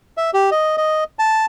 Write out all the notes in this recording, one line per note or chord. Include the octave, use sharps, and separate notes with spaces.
E5
G4
D#5
D#5
A5